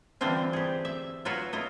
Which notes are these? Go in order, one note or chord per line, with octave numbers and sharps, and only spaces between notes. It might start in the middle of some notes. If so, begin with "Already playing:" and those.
D3 E3 G3 C4 D4 F4
G4 G#4
E5
F#3 F4 F#4 B4 C#5
E4 F4 D#5